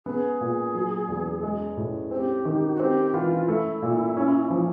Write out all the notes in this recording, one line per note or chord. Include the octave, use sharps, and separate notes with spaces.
B3 G#4
A#2
F#3
E2
G#3
A2
C4 G4
D#3
F#4
C4 G4
E3 F4
A3 E4
A#2
C#4
F3